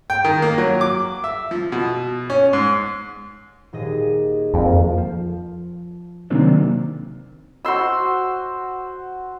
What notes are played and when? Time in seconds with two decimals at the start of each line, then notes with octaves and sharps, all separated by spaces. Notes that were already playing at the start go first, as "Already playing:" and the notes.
0.10 G5
0.25 D#3
0.42 A#3
0.58 F#3
0.81 D6
1.24 E5
1.51 F3
1.72 B2
2.30 C#4
2.53 G#2
3.73 D#1 G#4 D#5
4.54 F2 A#3
4.98 F3
6.30 C3 D#3 F#3 A#3 C4 D4
7.65 F#4 C5 C6 E6